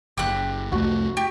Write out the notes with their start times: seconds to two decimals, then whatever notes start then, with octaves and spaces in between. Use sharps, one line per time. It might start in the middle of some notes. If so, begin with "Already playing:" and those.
0.18 F#1 G4 F#6
0.72 C2 F2 A3 F#4
1.17 G4